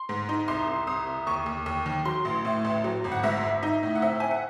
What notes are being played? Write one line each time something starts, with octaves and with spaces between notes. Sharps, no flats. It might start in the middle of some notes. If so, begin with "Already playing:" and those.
Already playing: C6
G#2
D#4
C2 C6
C2
C2 D#6
C2
D#2 C#6
D#2
D#2
D#3
F#3 C6
A1
A2
A1
F#3
G#1
F#5
G#2 E5
G#1
D#4
A2
F#5
C4 E5
C4 G#5
F#5